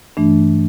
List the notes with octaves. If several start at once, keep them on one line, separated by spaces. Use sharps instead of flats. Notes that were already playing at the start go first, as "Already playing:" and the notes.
G2 E3 A3 D4